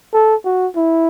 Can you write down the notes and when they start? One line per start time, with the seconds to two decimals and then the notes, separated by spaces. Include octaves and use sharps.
0.14 A4
0.45 F#4
0.76 E4